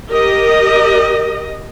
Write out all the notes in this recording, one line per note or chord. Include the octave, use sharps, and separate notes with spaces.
G4 A#4 D#5